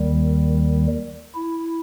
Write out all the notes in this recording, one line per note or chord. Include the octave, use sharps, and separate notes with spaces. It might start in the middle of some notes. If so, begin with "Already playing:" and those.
Already playing: D#2 D#3 G3
E4